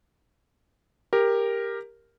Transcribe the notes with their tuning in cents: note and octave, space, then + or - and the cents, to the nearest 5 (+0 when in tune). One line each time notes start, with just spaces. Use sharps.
G4 +15 A#4 +0